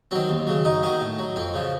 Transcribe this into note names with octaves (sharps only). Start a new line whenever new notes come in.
D#3 F#3 C4
D#2
C#3 F#3
F#2 D#4
D#3 F#3 D#4
A2
F#3
F2 C4
C#3 F3